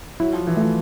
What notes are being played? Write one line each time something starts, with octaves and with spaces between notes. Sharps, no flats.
F#3 E4
F3
E3
F3 A3